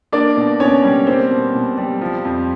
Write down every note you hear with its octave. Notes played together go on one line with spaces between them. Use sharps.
A#3 D4 D5
B2
B2 C#4 C#5
G3
A#3 C4 C5
B2
B2
G3
F3
F2